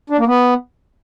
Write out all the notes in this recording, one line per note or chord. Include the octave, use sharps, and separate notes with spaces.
D4
A#3
B3